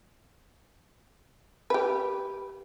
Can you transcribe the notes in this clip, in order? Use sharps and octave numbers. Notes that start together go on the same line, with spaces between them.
G4 B4